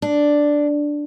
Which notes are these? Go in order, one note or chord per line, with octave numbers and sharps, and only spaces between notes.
D4